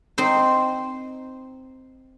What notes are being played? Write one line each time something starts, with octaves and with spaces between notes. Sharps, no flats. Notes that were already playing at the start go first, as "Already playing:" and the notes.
C4 D#4 C5